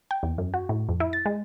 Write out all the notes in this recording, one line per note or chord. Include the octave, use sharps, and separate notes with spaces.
G5
E2
F#2
F#4
A2
F2
E4
A6
G#3